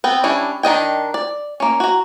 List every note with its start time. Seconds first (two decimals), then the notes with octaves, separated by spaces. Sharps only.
0.04 B3 C4 G5
0.24 G3 C#4 D4 E4
0.63 D#3 D4 D#5 G5
1.14 D5
1.60 A#3 C#4
1.80 F#4 A#5